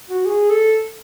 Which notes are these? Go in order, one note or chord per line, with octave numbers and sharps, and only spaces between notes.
F#4
G#4
A4